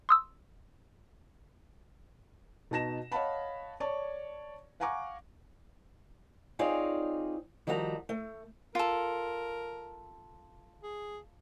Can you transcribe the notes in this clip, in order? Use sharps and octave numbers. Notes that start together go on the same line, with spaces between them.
C6 D#6 E6
B2 D#4 A5 A#6 E7
C#5 D#5 F5 F#5 A5 B5
C#5 D5 A5 C#6
F5 F#5 G#5 A#5 C#6 D6
C4 D#4 F4 G#4 C#5 D5
D#3 F3 G3 F#4 F5 A#5
A3
F4 A4 A#4
G#4